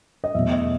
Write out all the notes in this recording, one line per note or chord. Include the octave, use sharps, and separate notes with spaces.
D#5
E2 B2 F#3 A3 E5
D#5